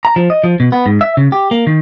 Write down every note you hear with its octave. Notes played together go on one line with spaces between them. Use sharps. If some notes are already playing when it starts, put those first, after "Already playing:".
A#5
F3
D#5
F3
B2
B3
G#2
E5
C#3
G4
A#3
D#3